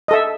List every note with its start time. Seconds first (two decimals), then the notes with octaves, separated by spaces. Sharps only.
0.08 D#5
0.11 A4
0.13 E5